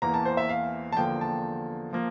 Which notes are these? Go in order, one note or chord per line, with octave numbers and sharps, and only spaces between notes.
E2 E3 A#3 A#5
A5
C5
E5
F5
A5
E2 D3 F3 A#3 G5
A5
F3 A#3